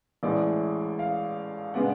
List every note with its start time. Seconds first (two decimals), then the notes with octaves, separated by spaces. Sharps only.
0.23 A1 A2 G#3 D5
0.99 F5
1.74 C#3 G#3 B3 D4 F#5